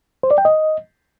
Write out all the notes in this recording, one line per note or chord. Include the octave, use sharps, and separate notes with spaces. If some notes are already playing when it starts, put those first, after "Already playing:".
C5
D5
G5
D#5